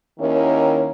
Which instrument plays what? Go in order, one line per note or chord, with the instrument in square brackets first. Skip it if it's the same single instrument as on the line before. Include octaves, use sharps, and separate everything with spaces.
[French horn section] D#2 D#3 A#3 C#4 E4 A#4